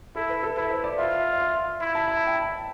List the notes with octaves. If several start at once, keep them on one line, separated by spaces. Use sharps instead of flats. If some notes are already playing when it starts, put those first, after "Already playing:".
E4 A4
B4
A4
E4 B4
C5
D5
F4 E5
E5
F5
E4
A5
B5
A5
G5
A5